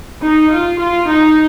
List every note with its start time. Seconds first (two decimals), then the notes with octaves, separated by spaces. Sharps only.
0.22 D#4
0.51 F4
0.79 F4
1.07 D#4